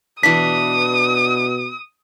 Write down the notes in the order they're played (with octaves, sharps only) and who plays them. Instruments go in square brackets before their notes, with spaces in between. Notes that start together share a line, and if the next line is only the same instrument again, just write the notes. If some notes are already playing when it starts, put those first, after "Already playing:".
[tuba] B2 [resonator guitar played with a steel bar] E3 D4 [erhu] D#6 [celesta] B6